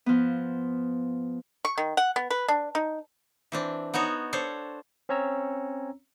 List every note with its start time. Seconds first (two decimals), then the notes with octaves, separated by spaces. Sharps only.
0.06 F3 B3
1.65 C#6
1.78 D#3
1.97 F#5
2.16 B3
2.30 B4
2.48 D4
2.75 D#4
3.52 E3 C4 D4
3.94 B3 D#4 F#4 C#5
4.33 D4 A4 C5 C#5
5.09 C4 C#4 C#5 A#5 E6